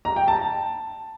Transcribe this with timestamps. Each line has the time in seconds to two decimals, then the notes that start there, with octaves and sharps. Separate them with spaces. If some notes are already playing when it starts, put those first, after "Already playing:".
0.05 A#5
0.16 G5
0.28 A5